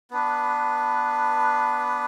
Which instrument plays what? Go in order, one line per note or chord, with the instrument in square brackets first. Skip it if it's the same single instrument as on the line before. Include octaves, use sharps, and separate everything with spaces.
[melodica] B3 D4 B4